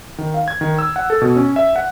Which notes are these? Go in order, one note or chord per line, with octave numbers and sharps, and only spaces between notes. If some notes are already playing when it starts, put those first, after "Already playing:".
D#3
F5
G#6
D#3
E6
F#5
A4
B2
C#4
E5
F#5